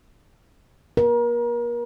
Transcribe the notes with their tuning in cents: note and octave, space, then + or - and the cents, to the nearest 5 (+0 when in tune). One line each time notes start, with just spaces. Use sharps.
A#4 +35